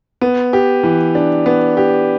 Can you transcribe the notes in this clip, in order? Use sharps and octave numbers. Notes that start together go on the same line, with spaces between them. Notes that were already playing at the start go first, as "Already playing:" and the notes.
B3
G4
E3
D4
B3
G4